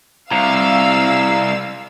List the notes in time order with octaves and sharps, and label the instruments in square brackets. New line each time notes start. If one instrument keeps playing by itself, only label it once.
[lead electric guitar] C2 [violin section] F5 E6 [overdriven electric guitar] A#5